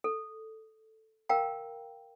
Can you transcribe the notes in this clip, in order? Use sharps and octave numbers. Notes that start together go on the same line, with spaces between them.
A4
A#4 F5 G5 A#5